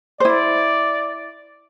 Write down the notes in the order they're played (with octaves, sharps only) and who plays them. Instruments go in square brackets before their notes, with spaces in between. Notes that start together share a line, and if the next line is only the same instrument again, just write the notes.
[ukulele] E4 C5 [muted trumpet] D5